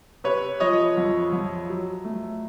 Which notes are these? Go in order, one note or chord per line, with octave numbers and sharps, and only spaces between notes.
C3 B4 C#5
F3 C#5 D#5
F2
F2
F#3
A3